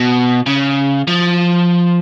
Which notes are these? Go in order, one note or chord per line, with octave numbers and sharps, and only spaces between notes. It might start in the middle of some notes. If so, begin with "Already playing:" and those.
Already playing: B2
C#3
F3